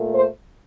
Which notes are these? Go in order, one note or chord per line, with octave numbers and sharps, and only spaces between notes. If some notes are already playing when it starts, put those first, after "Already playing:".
Already playing: A#2 A3
C5